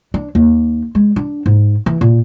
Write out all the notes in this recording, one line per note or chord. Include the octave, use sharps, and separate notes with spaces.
D4
D#2
G#3
D4
G#2
E3
A#2